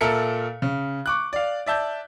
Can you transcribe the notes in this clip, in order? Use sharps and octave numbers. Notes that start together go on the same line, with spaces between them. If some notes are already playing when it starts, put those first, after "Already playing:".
A#2 A4 A#4 E5 C#7
C#3
C#6 D6 F#6
D5 F5
D5 E5 A5 G6